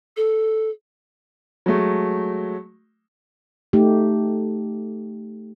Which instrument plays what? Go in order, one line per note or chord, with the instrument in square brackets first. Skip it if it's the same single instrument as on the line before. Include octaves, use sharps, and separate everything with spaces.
[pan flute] A4
[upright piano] F#3 G#3 A3
[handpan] A3 D#4 G4